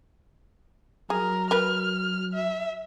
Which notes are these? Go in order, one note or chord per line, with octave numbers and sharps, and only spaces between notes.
F#3 G#4 A#4
A#4 B4 F6
E5